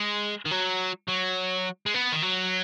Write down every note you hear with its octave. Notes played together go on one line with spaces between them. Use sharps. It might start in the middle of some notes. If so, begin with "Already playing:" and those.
Already playing: G#3
D#3
F#3
F#3
G#3
B3
D#3
F#3